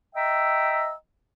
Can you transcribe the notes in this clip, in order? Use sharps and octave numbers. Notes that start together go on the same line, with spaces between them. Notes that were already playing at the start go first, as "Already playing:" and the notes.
D#5 E5 G5 A#5 E6